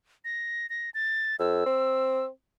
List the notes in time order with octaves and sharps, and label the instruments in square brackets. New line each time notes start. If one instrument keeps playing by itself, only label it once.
[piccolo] A#6
A#6
A6
[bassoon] F2 [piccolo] E6
[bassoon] C4